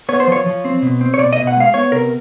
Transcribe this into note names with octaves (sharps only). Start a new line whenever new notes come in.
B3 C#5
C5
F3 C#5
F3
C4
B2
C4
C#5
B2 D5
B2 D#5
F#5
G#3 F5
B3 C#5
C3 A#4